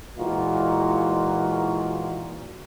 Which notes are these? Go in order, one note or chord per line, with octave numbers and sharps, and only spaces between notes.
A#2 E3 G#3 D#4 F4 F#4